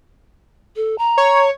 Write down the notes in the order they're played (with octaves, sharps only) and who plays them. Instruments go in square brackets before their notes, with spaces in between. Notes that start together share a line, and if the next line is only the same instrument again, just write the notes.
[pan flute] A4
A#5
[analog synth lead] C#5